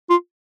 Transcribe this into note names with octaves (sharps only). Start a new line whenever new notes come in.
F4